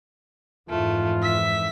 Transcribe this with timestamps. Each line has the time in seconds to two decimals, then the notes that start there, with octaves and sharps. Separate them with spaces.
0.70 F2 G#2 E3 A3 F4
1.23 E5 B6